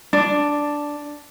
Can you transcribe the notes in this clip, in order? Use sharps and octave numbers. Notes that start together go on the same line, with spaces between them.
D4